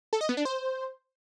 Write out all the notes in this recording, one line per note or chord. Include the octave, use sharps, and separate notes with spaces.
A4
D#5
B3
D4
C5